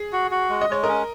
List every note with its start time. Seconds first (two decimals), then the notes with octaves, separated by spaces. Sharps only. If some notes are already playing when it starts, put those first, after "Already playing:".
Already playing: G#4
0.13 F#4
0.31 F#4
0.50 G#3
0.61 D#5
0.69 G#3 C#5
0.83 C#4 A#4 D#5